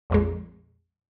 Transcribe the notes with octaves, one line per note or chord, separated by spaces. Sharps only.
A#1 F2 G#3